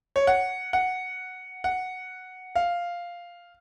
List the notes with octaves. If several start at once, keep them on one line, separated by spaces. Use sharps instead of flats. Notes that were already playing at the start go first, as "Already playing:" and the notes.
C#5
F#5
F#5
F#5
F5